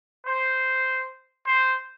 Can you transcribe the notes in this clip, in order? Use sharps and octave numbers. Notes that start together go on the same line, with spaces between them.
C5
C5